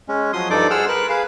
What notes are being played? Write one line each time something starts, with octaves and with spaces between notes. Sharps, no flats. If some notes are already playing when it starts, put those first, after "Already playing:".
G#3 C#4
F3 F#3 C6 D#6
G2 F3 D#4 A4 D5 D6
G#4 C5 F#5 E6 F6
A#4 B4 F#6
G#4 B4 F5